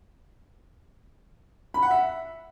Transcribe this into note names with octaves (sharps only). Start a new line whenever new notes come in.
B5
F#5
E5